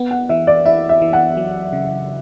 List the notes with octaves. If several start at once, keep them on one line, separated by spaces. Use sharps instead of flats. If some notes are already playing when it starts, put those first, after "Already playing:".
Already playing: B3
F#5
E3 E5
D5
E4 E5
E5
E3
F#5
F#3
C#3